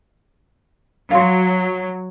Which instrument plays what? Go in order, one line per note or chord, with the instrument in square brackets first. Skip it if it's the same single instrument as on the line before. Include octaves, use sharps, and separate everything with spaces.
[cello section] F#3 [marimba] F5 C6